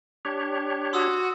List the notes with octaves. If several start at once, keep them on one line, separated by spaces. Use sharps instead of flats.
D4 G4 C#5
F#4 C6 D#6 E6